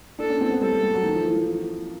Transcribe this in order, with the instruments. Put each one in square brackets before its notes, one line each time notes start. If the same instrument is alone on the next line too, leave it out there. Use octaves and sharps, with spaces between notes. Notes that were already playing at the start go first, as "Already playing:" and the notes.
[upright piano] D4 [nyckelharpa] A4
[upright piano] C#4
C4
B3
[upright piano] G3 [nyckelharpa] A4
[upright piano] G3
G3
F#3
D#3
F3
E3
F3
E3